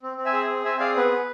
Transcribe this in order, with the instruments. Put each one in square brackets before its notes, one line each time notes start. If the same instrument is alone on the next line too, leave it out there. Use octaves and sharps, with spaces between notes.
[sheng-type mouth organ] C4
C4
E5 G#5
G#4
C4
C4 E5 G#5
G#4 D5 F5
B3 B4
B3